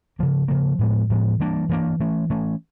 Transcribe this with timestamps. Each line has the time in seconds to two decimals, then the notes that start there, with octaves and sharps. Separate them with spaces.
0.19 C#3 F3 A#3
0.48 C#3 F3 A#3
0.79 A2 F3 G#3 B3
1.10 A2 F3 G#3 B3
1.39 E3 G3 A#3 D4
1.69 E3 G3 A#3 D4
2.00 E3 A3 C#4
2.30 E3 A3 C#4